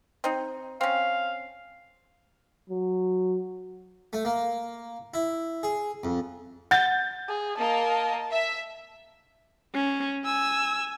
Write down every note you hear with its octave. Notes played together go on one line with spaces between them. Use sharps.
C4 D#4
C4 C#4 F5
F#3
A3
A#3
E4
G#4
F2
F#5 G6 A6
G#4
A#3 A#4 D#5 A5
E5
C#4
G#5 E6